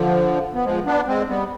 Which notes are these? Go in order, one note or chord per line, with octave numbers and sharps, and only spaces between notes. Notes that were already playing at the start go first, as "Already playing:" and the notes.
Already playing: D3 F3
B3
F3 G#3
B3 D4
G#3 C4
G3 B3